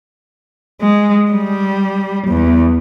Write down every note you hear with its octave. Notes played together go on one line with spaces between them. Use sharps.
G#3
G3
E2